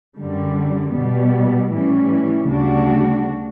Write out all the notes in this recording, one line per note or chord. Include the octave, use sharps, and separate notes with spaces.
F#2 D3 G3
B2 G3 B3
A2 E3 G3 C#4
D2 C#3 G3 D4 F#4